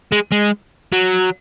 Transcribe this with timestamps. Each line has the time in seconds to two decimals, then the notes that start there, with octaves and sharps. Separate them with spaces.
0.12 G#3
0.32 G#3
0.93 F#3